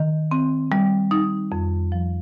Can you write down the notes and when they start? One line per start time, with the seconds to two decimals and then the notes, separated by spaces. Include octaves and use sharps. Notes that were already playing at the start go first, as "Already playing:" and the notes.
Already playing: D#3
0.31 C4
0.72 G3
1.11 D#4
1.52 F2
1.92 F3